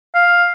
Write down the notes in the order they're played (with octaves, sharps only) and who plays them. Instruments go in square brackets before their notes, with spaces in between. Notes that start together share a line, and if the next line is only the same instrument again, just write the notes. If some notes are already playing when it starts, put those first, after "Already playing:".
[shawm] F5